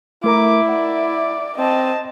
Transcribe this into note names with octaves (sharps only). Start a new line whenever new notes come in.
A3 E4 A#4 A#5 D6
D5 F#5
C4 D#5 A5